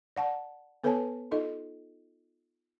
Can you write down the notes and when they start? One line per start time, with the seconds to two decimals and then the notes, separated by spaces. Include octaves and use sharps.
0.16 D5 F#5 A5
0.84 B3 A4 B4 C#5 G#5 A5
1.31 D#4 F4 A4 D#5